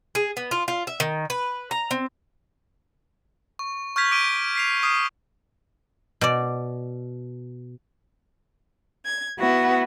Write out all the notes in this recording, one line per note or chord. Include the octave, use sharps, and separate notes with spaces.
G#4
B3
F4
F4
E5
D#3
B4
A#5
C4
C#6
C#6 F6 G6 G#6 B6 F7
D6 D7 D#7 G7
B6 C7 F7
D#6 F6 C7
B2 D5
G#6
B3 E4 F#4